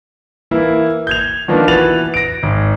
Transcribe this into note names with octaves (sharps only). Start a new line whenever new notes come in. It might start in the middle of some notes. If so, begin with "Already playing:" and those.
E3 A#3 E4
G6 G#6 F7
D#3 F3 A#3 B3 D4 F4
E3 F#4 B4 A6 F7 F#7
A#6 D7
G#1